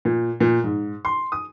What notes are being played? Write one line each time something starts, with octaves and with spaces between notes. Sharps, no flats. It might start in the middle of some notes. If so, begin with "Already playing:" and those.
A#2
A#2
G#2
C6
D#6